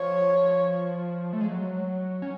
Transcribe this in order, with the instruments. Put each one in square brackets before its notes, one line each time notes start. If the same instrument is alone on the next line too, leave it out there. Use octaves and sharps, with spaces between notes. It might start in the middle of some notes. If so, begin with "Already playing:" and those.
Already playing: [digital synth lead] F3 [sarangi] C#5
[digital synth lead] A3
G#3
F#3
C#4